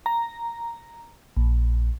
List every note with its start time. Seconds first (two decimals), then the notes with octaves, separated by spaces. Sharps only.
0.06 A#5
1.37 A#1